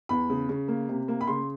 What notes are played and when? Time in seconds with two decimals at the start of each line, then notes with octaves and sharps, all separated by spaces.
0.09 E2 B5
0.30 C#3
0.49 C#3
0.68 A#3
0.89 C3
1.08 A#3
1.21 B5
1.27 C#3 C6